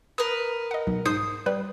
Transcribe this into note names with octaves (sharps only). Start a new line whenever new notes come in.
A#4 B4 D#6
D#5 F#5
B1
G#2 C5 D#6 C7
G3 B4